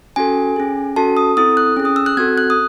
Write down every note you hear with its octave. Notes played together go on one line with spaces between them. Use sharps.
C#4 F#4 A4 G#5
C#4 G#4
C#4 F#4 A4 A5
D#6
C4 E4 A4 D#6
F#6
C#4 G#4
D#6
E6
F#6
C4 F#4 A4 G#6
F#6
D#6